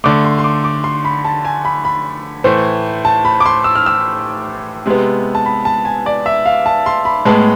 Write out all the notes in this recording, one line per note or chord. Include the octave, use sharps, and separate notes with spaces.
D3 A3 D6
C6
C6
D6
D6
C6
B5
A5
G#5
B5
B5
A2 E3 A3 C5
A5
B5
D6
C6
E6
F6
E6
C3 G#3 B3
A5
B5
A5
G#5
D5
E5
F5
A5
C6
B5
A2 G#3 B3 A5